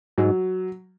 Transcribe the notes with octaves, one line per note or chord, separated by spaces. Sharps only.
G#2 F#3